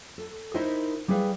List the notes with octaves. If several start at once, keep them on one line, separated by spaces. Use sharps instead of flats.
A4
D#4 E4 A#4 C5 D#5 E5
G3 E4 G#4 B4 F5